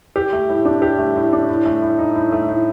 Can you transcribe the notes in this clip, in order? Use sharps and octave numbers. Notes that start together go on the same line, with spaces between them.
G4
A3
A2
D4
G4
A3
A2
D4
A2
A3
A2
D#4
A2
A3
A2